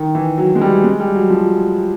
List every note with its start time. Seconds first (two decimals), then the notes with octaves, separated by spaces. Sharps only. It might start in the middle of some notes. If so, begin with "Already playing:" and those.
Already playing: D#3
0.15 E3
0.38 F#3
0.55 G#3
0.61 G3
0.84 G#3
1.00 G3
1.15 F#3
1.30 F3